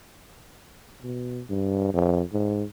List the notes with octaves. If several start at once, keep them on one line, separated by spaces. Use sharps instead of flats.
B2
G2
F2
G#2